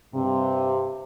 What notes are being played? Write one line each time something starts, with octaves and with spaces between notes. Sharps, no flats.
G2 C3